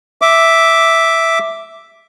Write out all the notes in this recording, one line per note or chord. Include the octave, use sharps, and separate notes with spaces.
E5 D6